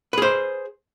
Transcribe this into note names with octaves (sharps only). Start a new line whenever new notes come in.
G#4 B4 C5